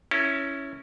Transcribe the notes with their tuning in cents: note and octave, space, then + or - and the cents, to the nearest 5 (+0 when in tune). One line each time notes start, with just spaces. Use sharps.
C#4 +0 E4 +0 A#4 -45